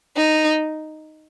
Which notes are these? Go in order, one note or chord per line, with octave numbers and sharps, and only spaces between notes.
D#4